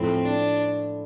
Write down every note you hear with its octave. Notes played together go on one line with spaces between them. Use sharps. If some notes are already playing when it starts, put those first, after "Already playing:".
Already playing: A2 F3 A3 C4 E4
D4